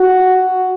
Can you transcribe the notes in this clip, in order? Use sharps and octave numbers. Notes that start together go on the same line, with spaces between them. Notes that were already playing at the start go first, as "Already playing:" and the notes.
Already playing: F#4